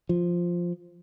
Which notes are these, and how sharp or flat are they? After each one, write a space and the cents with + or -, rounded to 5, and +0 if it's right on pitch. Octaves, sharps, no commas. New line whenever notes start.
F3 +0